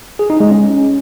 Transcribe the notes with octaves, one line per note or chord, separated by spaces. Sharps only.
G#4
D#4
G#3
C#4